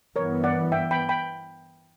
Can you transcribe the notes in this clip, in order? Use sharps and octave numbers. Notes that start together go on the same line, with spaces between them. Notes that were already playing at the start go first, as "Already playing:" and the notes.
G2 E3 B3 A#4 C#5
D5 F#5
E5 G5
G5 B5
G5 B5